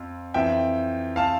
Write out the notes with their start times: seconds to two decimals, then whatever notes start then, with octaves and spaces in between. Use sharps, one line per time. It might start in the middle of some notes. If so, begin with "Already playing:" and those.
Already playing: F2
0.34 F2 E3 E5 G5
1.16 F5 A5